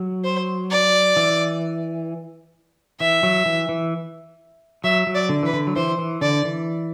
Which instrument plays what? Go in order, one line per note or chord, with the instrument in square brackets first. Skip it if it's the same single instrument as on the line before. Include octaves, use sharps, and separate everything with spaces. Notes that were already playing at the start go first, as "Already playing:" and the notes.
Already playing: [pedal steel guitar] F#3
[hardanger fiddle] C5
D5
[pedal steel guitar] E3
[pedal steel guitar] E3 [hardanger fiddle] E5
[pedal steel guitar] F#3
E3
E3
[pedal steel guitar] F#3 [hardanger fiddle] E5
[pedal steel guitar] F#3
[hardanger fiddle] D5
[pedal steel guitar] D3
[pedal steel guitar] E3 [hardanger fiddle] B4
[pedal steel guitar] D3
F#3
[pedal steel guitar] E3 [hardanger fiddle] C5
[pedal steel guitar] E3
[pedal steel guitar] D3 [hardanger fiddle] D5
[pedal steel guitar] E3